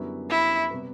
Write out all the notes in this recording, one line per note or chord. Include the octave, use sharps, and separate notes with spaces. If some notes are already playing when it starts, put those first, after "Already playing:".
Already playing: F#2 D3 G3 B3 E4
E4
C3 G3 B3